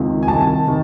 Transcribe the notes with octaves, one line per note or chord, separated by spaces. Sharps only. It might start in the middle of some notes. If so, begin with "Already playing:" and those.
Already playing: C#2 C3 D#3
G#5
C2 C3 D#3 A5
C3 D#3